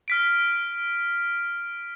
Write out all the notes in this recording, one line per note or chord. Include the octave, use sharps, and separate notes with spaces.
F6 B6 D7